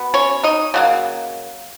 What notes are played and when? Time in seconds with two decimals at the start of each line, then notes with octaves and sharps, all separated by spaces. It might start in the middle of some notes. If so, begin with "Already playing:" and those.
Already playing: B2 B3
0.14 C#4 C#5
0.44 D#4 D#5
0.74 C#3 F#3 A#3